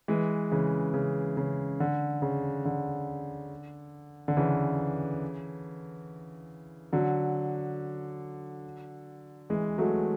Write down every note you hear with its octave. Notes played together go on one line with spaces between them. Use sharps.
E3 G#3
C#3 E3
C#3
C#3
D3
C#3
D3
D3
C#3 E3
D3 F#3
E3 G#3
F#3 A3